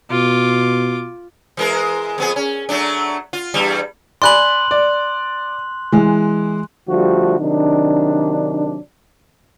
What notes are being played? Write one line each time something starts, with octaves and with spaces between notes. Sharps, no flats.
B2 F4 D6
E3 G#3 A#4
F2 B3 G#4
C#4
F#3 A3 D4
F4
E2 G2 G3
D5 G#5 B5 C6 F#6 F#7
D5
E3 G#3
D3 F3 G3 A3 F#4
C3 D#3 F#3 D4